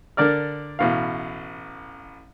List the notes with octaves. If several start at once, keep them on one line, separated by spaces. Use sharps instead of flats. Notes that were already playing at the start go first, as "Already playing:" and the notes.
D3 A#4 D5 F6
A1 B2 F5